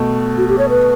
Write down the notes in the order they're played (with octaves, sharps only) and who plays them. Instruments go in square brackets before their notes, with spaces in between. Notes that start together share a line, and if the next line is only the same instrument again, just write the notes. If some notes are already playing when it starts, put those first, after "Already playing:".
Already playing: [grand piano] B2 A3
[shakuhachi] F#4
G4
C#5
B4